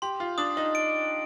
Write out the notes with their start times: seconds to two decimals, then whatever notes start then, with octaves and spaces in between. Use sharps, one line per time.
0.02 G4 C6
0.20 F4
0.38 D4 D#6
0.57 D#4
0.75 D7